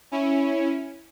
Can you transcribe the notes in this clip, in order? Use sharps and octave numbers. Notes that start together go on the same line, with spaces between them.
C#4 E4